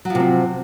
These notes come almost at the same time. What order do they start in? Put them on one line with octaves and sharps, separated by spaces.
F#3 F3 C3 C4